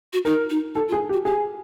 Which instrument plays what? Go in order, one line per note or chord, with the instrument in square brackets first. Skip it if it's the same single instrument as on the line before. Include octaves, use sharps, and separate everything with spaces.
[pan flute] F#4
[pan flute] D#4 [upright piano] A#4
[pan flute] D#4
[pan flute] D#4 [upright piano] A4
[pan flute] F4
[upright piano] G#4
G4
[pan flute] F#4
[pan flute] G4 [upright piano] G#4